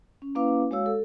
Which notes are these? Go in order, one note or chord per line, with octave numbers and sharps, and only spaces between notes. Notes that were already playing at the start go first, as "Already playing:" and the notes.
C#4
A#3 C#4 E4 B4 F5 D6
G#3 F#4 C#5 F5 E6
A4